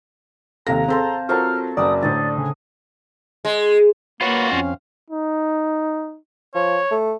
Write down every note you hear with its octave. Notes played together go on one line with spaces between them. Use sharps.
D#2 C3 A4 F5 A#5 A#6
C4 G#4 A4 C5 A5 C6
F#3 F4 A4 A#4 C5 C#6 F6
F#1 F#3 C4 D5 A5 D#6
A2 D3 C4 D#5 A6
C#3 G#5
G#3
A#3 F4 F#4 B4 C#5 B5
F2 C4 C#4 F5
D#4
F3 C#5
A3